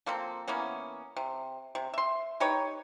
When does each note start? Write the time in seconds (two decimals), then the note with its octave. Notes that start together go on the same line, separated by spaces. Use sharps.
0.06 F3 A#3 C4 A4
0.48 E3 A#3 B3 C#4
1.17 C3
1.75 C3
1.94 E5 C6
2.40 D#4 G4 B4 C#5